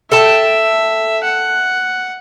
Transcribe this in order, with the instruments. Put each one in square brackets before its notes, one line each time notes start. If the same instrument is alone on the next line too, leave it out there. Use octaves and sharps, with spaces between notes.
[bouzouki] A4 G5 A5 [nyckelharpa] E5
[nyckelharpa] F#5